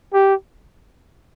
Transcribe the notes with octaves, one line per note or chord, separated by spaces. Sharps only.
G4